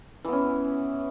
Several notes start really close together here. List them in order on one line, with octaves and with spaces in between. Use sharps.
E3 B3 C#4